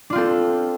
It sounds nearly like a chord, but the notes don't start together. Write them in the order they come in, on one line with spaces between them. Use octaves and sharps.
D4 F4 C4 A4